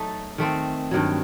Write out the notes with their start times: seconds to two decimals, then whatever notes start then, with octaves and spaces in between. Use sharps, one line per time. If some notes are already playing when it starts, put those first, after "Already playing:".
Already playing: F#3 A3 D#4 A4
0.38 D#3 A3 C4
0.91 G2 D#3 F#3